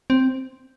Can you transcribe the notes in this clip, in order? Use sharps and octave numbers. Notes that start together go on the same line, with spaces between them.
C4